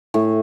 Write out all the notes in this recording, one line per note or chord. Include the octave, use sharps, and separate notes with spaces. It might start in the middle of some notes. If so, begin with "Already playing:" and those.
A2